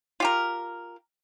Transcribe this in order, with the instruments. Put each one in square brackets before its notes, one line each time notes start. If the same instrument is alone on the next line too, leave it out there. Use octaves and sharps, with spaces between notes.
[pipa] F4 G4 A#4